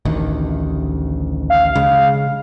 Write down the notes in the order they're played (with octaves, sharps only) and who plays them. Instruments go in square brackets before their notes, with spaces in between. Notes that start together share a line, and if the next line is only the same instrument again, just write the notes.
[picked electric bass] A1 D2 D#3
[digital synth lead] F5
[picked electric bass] C#3 G#3